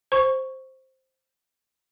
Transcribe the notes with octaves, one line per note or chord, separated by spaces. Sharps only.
C5 C#6